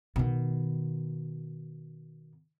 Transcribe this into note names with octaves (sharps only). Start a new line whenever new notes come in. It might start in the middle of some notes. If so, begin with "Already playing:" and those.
B2 D#3